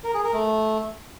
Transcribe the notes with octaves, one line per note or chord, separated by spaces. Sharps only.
A#4
G#4
A#4
A3